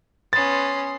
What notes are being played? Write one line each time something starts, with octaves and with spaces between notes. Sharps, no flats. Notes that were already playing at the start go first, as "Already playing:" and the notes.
B3 C#4 C6 D#6 A6